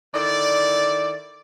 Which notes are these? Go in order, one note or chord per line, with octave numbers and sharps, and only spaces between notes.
D#3 E4 A4 D5